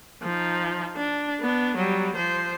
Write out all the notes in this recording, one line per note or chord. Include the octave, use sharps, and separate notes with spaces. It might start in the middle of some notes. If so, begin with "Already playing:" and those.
F3 D#4
D4
B3 D4
F#3 G3
F3 C5